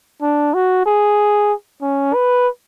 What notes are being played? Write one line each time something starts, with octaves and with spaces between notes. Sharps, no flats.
D4
F#4
G#4
C#4
B4